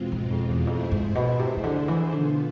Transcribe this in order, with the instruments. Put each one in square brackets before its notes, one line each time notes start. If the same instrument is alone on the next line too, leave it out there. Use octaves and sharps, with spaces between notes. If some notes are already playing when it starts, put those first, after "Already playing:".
Already playing: [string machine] E2 B2 G#3 C4 F4
[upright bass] G#2
F2
E2
[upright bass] F2 [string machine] A3 E4 G#4 C5
[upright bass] G#2
B2
C3
C3
D3
E3
[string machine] B2 B3 F4 [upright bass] D3